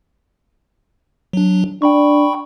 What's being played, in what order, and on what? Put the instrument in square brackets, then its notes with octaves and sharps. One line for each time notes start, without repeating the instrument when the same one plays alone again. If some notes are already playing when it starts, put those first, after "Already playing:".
[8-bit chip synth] F#3 D4
[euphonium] D4 [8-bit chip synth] G5 B5 C#6